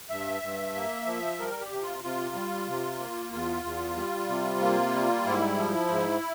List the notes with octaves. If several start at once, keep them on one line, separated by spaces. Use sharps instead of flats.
G2 E5
G2
A#3
F3
G3 A#4
G4
C3
F4
C3 F4
G3
C3
A#3
E2 F4
E2
G3
C3
A#3
G3
G#2 E4
F3
G#2